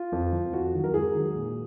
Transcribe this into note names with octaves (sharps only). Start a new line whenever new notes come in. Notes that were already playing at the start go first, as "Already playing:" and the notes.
Already playing: F4
F2
F3
F2 F#4
D#3 F#3
A#4
G#2 G#4
D#3 F#3
A#2